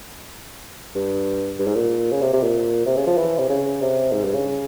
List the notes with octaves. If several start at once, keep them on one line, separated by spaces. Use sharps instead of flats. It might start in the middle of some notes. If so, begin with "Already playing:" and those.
G2
G2
G#2
A#2
C#3
C3
C3
A#2
C3
C#3
F3
E3
C3
C#3
C3
G#2
G2
C#3